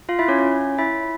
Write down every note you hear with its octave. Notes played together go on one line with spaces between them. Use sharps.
F4 F5
E4 E5
C#4 C#5
C#4 C#5
E4 E5